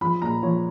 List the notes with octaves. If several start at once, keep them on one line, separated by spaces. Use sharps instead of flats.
F3 B5
A#2 A#5
F3 C#5